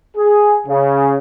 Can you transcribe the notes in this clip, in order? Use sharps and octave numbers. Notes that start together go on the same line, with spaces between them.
G#4
C#3